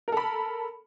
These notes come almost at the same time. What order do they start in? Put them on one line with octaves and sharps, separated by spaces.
A#4 A4 B5